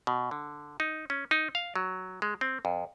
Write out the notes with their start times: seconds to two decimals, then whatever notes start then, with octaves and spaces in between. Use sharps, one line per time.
0.07 B2
0.31 D3
0.80 D#4
1.10 C#4
1.31 D#4
1.55 F5
1.76 F#3
2.22 G#3
2.41 C4
2.65 F2